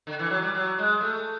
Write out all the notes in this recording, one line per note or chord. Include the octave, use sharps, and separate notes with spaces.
D3
E3
F#3
G3
F#3
G#3
A3